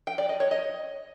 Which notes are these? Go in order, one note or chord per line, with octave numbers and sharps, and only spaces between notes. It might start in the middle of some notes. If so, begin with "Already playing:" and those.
G5
D5
D#5
C#5
D#5